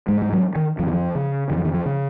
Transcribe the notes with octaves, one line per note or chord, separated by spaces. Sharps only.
G#2 G#3
G#3
F#3
D#3
F2 F3
D#3
F3
C#3
F2 D#3
F3
D#3
F3
C#3